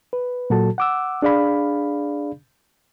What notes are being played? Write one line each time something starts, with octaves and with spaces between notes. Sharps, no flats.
B4
A#2 F#3 F#4 A4 A5
F#5 D6 E6
D4 G#4 D5 F5 B5